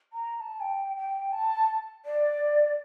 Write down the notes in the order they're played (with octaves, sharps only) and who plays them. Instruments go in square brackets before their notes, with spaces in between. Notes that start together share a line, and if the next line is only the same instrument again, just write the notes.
[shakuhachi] A#5
A#5
A5
G5
G5
A5
D5